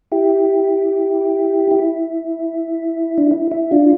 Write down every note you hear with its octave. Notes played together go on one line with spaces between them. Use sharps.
E4 G4
E4
D4
E4
E4
D4 F4